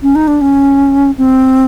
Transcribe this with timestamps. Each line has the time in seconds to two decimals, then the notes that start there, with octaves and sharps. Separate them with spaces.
0.02 C#4
0.15 D#4
0.28 D4
0.41 C#4
1.18 C4